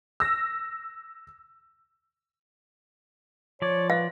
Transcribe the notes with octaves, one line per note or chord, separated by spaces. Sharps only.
E6 A#6
F3 C#5 D5
B4 F5